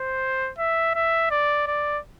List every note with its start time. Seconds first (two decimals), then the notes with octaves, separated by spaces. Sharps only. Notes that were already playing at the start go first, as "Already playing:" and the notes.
Already playing: C5
0.58 E5
0.95 E5
1.31 D5
1.67 D5